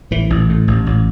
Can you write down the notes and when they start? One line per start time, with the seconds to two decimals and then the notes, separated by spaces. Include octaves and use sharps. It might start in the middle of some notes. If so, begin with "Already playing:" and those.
0.11 A1 E3
0.30 A1
0.49 A2
0.68 A1
0.86 A1